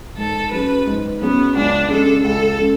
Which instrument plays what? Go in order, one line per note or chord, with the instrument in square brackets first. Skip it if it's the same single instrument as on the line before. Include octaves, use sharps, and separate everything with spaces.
[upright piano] G#2 [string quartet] A4
[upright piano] F#3 C#4 G#4 [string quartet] B4
[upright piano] G#2
[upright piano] F#3 C#4 G#4 [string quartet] B3
[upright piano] C#2 [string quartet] D4
[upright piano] C#3 G#3 [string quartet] A4
[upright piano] C#2 [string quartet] A4
[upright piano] C#3 G#3